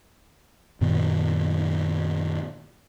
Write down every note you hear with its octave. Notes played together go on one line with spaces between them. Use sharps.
F#2 A#2 D#3 B3